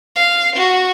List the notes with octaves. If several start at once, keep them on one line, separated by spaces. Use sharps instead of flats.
F5
F#4